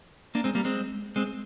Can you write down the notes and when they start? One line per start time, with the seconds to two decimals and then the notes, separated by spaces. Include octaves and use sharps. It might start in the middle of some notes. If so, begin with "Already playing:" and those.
0.35 A#3 D4
0.44 G#3 C4
0.55 G3 A#3
0.65 G#3 C4
1.16 G#3 C4